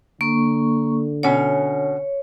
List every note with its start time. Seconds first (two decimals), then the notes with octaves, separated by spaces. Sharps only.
0.21 D3 A#3 C#6
1.23 B2 C#4 C#5 F#5